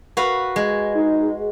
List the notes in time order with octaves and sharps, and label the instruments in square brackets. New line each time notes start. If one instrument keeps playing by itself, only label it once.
[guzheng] F#4 B4 F5
G#3
[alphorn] D#4